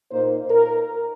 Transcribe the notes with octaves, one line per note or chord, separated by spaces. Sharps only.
A#2 A#3 D#4 C5
A#4